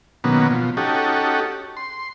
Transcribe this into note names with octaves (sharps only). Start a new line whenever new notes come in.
B2 D#3 F#3 A#3 B3 C#4
B2 F3
C#4 D#4 F#4 G4 A4
C6